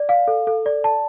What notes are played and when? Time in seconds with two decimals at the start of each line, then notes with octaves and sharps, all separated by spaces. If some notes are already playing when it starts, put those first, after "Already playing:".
Already playing: D5
0.09 F5
0.28 A4
0.47 A4
0.66 D5
0.84 A5